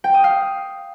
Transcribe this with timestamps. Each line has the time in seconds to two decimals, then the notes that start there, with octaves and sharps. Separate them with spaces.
0.04 G5
0.14 D#6
0.24 F5